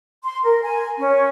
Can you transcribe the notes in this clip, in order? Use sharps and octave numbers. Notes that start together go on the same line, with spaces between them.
C6
A#4
G#5
C#4